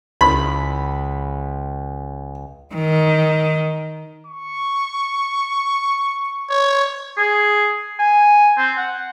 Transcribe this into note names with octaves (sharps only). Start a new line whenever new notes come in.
C#2 B5
D#3
C#6
C#5
G#4
G#5
C4
F#5